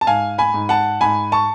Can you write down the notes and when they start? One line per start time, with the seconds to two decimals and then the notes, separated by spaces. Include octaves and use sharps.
0.01 A5
0.07 G#2 F5 G#5
0.38 G#5 B5
0.54 G#2
0.69 F#5 A5
1.01 G#2 G#5 B5
1.32 A5 C#6